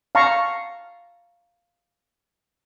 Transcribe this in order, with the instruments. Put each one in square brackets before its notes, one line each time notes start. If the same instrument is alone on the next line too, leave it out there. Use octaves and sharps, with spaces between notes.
[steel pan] F5 A5 A#5 C#6